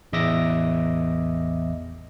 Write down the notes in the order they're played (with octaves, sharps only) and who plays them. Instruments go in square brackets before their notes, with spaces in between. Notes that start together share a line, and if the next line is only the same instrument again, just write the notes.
[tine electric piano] A1 E2 D#5 E5 D6 A#6